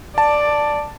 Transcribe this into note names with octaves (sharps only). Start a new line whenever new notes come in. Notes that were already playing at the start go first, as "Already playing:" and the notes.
D5 A5